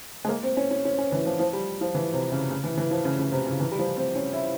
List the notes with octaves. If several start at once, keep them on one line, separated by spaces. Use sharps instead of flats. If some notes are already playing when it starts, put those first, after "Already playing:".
G#3
A#3
C4
C#4
C#4
C#4
C#4
E3
F3
F3
G3
F3
E3
C3
C#3
C#3
E3
E3
F3
C#3
C#3
C3
C#3
E3
G3
F3
C4
C#4
E4